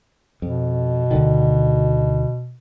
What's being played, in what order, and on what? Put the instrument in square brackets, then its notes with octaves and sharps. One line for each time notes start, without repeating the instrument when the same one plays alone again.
[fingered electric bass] F2 [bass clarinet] B2
[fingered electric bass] D2 D3 D#3